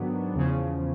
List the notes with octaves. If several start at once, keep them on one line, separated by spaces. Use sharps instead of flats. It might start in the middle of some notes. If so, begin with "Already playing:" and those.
Already playing: G#2 D#3 F#3 B3 D4
E2 C#3 F3